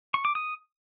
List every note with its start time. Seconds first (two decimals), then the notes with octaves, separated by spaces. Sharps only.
0.14 C#6
0.25 D6
0.35 D#6